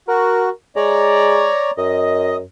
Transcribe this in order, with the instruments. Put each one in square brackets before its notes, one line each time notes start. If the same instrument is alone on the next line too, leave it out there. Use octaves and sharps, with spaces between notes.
[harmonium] F#4 [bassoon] A#4
[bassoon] G#3 [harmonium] C#5 D5 A#5
[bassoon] F#2 [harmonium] D#5